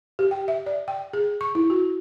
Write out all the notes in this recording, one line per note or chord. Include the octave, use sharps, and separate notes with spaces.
G4
G5
E5
D5
G5
G#4
C#6
E4
F#4